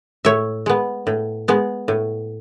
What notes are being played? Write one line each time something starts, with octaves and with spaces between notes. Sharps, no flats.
A2 C#5 E5
G#3 B3
A2
G#3 B3
A2